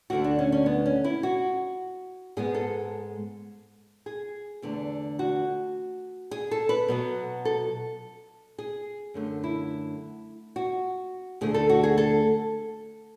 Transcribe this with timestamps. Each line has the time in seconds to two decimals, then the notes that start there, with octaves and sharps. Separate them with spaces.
0.10 D2 D3 A3 F#4
0.24 D4
0.39 C#4
0.52 C#4
0.66 B3
0.86 C#4
1.04 E4
1.23 F#4
2.37 G#2 G#3 B3 G#4
2.54 A4
4.06 G#4
4.62 E2 D3 A3
5.19 F#4
6.31 G#4
6.51 A4
6.69 B4
6.88 B2 F#3 B3
7.45 A4
8.58 G#4
9.14 F#2 D3 A3
9.44 E4
10.56 F#4
11.41 D2 D3 A3 G#4
11.54 A4
11.69 F#4
11.83 G#4
11.98 A4